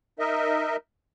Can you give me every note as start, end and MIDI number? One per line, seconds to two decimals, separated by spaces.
0.19 0.76 63
0.19 0.76 70
0.19 0.76 75
0.19 0.76 76